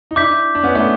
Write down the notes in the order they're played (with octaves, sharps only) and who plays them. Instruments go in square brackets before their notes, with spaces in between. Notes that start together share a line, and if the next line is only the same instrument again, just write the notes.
[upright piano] D#4
[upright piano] D4 E4 [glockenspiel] D6 G6 B6
[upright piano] D4
B3 C#4
A3 B3